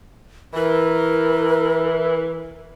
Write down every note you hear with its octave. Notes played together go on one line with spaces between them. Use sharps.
E3 A#4